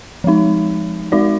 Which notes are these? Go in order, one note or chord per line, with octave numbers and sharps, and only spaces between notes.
F3 G#3 D#4
G#3 D#4 F#4 D5